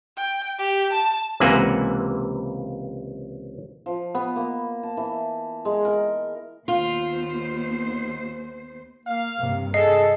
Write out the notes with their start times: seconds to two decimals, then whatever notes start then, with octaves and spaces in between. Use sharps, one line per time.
0.17 G5
0.58 G4
0.92 A5
1.40 C#2 C3 E3 A#3 F#5 G#5
3.86 F3
4.15 B3
4.36 A#3
4.83 A5
4.97 E3
5.65 G#3
5.85 A#4
6.68 D#2 B3 F4 C5
9.06 A#3 F5
9.39 G2 C3 A#3
9.74 G#4 A4 D#5 C7